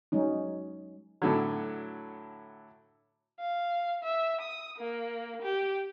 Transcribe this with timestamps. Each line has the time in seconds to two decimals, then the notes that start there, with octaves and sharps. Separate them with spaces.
0.12 F#3 G#3 C#4 D#4
1.22 A2 D3 F#3
3.40 F5
4.03 E5
4.41 D#6
4.78 A#3
5.42 G4